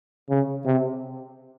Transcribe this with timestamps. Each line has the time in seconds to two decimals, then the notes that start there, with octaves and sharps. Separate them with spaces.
0.30 C#3
0.66 C3